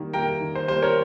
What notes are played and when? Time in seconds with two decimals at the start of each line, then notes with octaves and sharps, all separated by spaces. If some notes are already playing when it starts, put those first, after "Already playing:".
Already playing: D#3 G3 A#3
0.13 G3 A#3 G5 A#5
0.41 D#3
0.55 C5
0.68 G3 A#3 C5
0.82 A#4 C#5